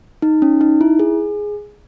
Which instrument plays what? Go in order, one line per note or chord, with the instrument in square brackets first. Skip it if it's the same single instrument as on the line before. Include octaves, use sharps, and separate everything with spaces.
[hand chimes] D#4
C#4
D#4
E4
G#4